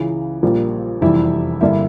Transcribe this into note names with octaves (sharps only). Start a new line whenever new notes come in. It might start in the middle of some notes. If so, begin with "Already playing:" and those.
Already playing: C#2 C#3 E3
A#1 A#2 G3 A#3
F1 E2 E3 G3 E4 E5
G2 D3 G3 A#3 E4 E5